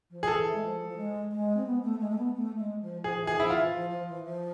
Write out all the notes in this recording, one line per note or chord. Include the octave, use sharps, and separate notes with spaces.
F3
G#4
E3 A4
G#3
F3
F3
G#3
G#3
C4
B3
A3
G#3
A3
B3
A3
G#3
F3
F3 G#4
F3
E3
G#4
F3 E4
F4
E3
F3
F3
E3
F3